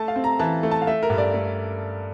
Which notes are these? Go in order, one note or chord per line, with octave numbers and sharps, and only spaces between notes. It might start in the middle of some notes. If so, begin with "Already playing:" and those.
Already playing: A3 A5
F5
C4
A#5
E3 A5
A3
A5
F5
A3 E5
A#4
G2
D5
A3